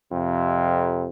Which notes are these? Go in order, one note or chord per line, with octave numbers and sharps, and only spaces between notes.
F2 C3